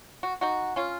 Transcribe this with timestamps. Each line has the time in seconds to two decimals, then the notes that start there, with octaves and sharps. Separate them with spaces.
0.23 F#4
0.41 D#4 F#4
0.76 C#4 F4